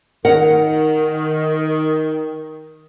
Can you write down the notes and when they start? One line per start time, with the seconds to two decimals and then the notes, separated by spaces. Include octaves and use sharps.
0.25 D#3 A#4 F#5